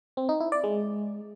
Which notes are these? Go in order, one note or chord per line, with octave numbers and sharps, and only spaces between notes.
C4
D#4
E4
D5
G#3